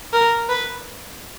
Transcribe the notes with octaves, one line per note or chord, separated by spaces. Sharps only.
A#4
B4